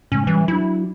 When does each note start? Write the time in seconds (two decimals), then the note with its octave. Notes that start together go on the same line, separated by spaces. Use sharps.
0.12 A2 C#3 G#3 C#4
0.27 E3 G3 C#4
0.48 F#3 D4 E4